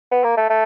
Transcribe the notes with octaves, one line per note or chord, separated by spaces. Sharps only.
B3
A#3
A3
A3